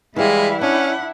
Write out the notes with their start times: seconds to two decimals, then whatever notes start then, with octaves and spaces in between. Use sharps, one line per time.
0.16 E3 G3 G#3 E4 F5
0.61 C#4 D4 F#5